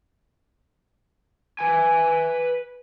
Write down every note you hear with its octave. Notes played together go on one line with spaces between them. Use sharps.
B4 G#5